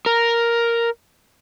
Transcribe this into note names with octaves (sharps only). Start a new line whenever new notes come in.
A#4